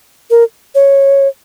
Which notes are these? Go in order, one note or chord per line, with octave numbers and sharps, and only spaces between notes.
A#4
C#5